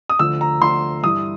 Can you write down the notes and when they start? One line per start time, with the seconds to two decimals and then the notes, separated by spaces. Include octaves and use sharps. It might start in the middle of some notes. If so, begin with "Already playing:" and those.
0.10 D#6
0.19 D2 D3 F3 E6
0.41 A#5
0.61 D2 D3 F3 C6
1.03 G2 E3 D#6